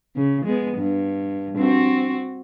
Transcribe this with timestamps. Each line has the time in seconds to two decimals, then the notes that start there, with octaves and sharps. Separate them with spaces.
0.16 C#3
0.45 G#3 B3
0.78 G2
1.58 C4 F#4